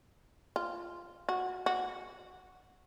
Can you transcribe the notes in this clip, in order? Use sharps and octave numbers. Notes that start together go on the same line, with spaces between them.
F4
F#4
F#4